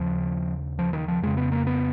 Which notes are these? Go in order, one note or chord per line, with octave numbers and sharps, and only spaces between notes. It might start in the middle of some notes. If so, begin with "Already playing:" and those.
Already playing: D#2 C#3 F3
F3
D#3
F3
F2 C#3 G#3
B3
A#3
B3